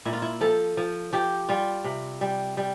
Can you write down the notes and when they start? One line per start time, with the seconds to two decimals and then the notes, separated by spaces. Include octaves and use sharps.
0.05 A#2 E4
0.13 F4
0.22 E4
0.41 F3 A4
0.77 F3
1.13 F3 G4
1.49 G3 F4
1.84 C3
2.21 G3
2.57 G3